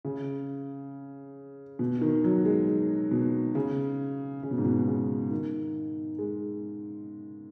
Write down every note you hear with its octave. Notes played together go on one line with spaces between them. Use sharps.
C#3
B2
D#3
F#3
G#3
B2
C#3
C#3
B2
G#2
B2
C#3
D#3
G#3